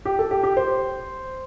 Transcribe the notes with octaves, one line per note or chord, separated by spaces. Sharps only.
G4
A4
G4
G4
C5